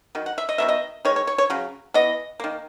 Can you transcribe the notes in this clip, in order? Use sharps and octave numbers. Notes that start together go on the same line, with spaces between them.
D#3 F#3
F#5
E5
D#5
D#3 F#3 B3 E5
D#5
D#3 G#3 C#5
C#5
C#5
C#5
C#3 F#3
E3 B3 D#5
D#3 A#3